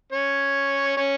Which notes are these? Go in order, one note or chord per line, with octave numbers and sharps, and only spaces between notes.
C#4 C#5
C#4 C#5